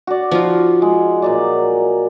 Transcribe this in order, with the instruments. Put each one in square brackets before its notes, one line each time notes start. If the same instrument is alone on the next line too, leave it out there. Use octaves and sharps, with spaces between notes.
[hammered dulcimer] F#4 D5
[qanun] F3 D#4 F4
[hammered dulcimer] G#3
A#2 F#3 D5